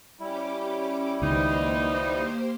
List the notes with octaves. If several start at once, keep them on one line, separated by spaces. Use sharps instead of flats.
G3 C#4 E4 G4 D6
C#2 B2 D#3 A#3 D4 D#4 G4 C5